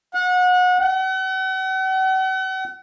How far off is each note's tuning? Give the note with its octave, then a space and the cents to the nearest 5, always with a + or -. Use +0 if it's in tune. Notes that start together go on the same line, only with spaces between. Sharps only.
F#5 -30
F#5 +40